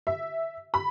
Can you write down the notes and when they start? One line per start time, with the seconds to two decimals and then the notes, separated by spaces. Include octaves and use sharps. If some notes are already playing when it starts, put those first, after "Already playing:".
0.07 E5
0.74 B5